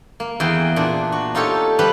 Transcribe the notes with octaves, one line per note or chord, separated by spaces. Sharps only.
A#3
E2 G#4 G5
A#2 D4
F#4
D#4 F4 G4 A4 C#5
F3 G3 G4 B4 B5